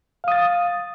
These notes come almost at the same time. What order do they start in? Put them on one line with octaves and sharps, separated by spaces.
F5 D#6 A6